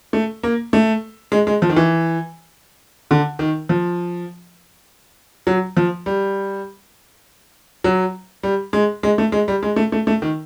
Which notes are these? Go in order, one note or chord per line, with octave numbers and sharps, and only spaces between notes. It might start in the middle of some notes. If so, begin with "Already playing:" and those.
A3
A#3
A3
G#3
G#3
F3
D#3
E3
D3
D#3
F3
F#3
F3
G3
F#3
G3
G#3
G#3
A3
G#3
G3
G#3
A3
A3
A3
D#3